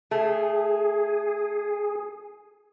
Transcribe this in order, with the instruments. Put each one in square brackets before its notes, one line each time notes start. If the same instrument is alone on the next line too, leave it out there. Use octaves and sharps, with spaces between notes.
[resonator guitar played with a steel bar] A3 [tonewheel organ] G#4